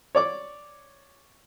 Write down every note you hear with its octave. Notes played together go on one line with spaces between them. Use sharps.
C#5 D5 D6